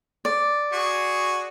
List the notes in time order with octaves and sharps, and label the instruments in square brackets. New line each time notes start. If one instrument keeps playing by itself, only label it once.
[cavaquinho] D5
[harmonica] F#4 G#4 C#6